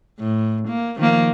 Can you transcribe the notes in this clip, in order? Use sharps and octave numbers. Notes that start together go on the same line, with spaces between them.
A2
A#3
D#3 F3 A#3